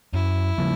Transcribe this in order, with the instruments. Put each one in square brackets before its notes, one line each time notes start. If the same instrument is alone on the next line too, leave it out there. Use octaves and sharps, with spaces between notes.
[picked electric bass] F#2 [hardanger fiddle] E4
[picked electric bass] C#3 F3 A#3